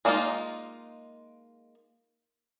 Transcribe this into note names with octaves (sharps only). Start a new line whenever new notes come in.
G#3 A#3 D4 D#4 F4